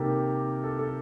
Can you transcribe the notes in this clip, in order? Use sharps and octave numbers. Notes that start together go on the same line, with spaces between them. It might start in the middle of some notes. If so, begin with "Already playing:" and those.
Already playing: C3 D#3 A#3 G4 A4 A#4
A4
A4